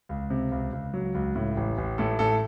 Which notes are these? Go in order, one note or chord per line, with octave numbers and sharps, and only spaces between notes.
C#2
C3
C#2
C#2
F#3
C#2
A2
A1
A1
A2 A4
A2 A4